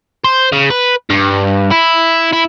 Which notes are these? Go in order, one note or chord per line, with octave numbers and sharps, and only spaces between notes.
C5
C#3
B4
G2
E4
E4